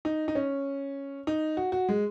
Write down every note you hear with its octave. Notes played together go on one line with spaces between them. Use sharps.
D#4
D#4
C#4
D#4
F#4
F#4
G#3